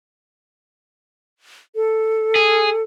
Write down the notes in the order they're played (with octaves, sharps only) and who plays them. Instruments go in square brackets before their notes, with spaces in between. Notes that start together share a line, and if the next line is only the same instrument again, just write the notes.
[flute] A4
[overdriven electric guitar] G#4